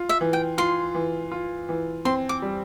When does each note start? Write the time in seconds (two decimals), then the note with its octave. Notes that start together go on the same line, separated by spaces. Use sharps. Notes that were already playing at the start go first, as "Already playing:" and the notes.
Already playing: F4
0.09 E5
0.21 E3
0.33 G5
0.58 F4 C6
0.95 E3
1.32 F4
1.69 E3
2.05 C4 C6
2.29 D6
2.42 G3